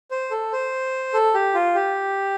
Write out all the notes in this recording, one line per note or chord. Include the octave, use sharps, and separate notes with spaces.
C5
A4
C5
A4
G4
F4
G4